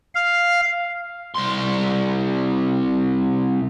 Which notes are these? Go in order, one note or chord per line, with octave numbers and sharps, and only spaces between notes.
F5
C2 C6